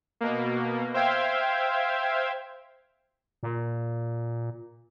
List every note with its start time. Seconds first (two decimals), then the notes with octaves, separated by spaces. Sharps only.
0.21 B2 A#3
0.94 C5 E5 F5 G5 G#6
3.43 A#2